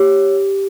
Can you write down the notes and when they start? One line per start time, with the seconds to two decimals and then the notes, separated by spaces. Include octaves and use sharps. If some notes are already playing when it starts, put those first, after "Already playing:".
Already playing: G4 C#5